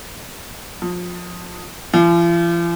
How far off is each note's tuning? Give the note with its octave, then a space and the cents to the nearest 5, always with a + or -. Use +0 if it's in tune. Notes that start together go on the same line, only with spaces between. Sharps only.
F3 +25
F3 -45